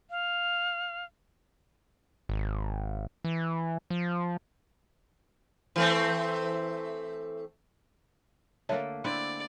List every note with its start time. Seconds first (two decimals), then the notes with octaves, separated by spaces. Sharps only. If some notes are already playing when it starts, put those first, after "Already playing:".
0.10 F5
2.29 G#1
3.25 E3
3.90 F3
5.76 E3 A3 C4
8.69 D3 A3 A#3 C#5 E5 A5
9.04 D3 C4 E4 D5